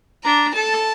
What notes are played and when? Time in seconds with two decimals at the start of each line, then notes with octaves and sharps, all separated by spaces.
0.24 D4 A#5
0.54 A4 A5